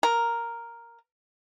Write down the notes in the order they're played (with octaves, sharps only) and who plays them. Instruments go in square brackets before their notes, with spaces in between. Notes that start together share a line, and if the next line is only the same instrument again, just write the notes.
[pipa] A#4